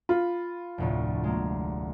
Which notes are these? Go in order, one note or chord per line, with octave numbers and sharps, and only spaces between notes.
F4 B5
F1 D2 A2
G#3 A#3